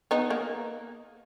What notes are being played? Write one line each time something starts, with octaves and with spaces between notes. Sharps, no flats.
B3 D#4
A#3